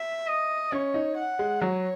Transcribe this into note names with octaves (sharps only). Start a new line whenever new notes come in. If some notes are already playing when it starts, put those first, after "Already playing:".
Already playing: E5
D#5
C#4 C#5
D#4
F#5
G#3
F#3 C#5